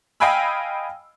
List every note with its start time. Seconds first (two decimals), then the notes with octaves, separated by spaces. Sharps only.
0.20 D#5 F5 G5 G#5 B5 E6